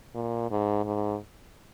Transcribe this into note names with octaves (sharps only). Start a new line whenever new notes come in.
A#2
G#2
G#2